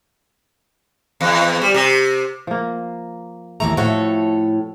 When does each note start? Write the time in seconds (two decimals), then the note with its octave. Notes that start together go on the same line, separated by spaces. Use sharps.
1.21 E2
1.61 G3
1.74 C3
2.47 F3 A#3
3.60 D#2 E3 A3 A#5
3.77 A2 F3 A3 F#4 A4 C#5